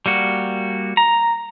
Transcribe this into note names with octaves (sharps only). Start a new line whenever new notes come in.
G3 A#3 F#4
A#5